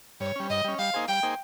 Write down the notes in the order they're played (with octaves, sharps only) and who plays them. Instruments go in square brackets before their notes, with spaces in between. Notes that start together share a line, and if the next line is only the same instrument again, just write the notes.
[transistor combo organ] G2 [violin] C#5
[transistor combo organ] G3 C#4
[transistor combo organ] G2 [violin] D#5
[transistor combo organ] G3 C#4
[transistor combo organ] G3 [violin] F5
[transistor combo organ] A#3 D#4 G#4 C5
[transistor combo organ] G3 [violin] G5
[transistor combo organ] A#3 D#4 G#4 C5